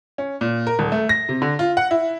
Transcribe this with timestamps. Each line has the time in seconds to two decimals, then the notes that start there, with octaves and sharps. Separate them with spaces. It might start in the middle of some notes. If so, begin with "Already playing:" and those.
0.18 C#4
0.41 A#2
0.67 A#4
0.79 D#1
0.92 A3
1.09 A#6
1.29 C3
1.42 D3
1.59 F4
1.77 F#5
1.91 E4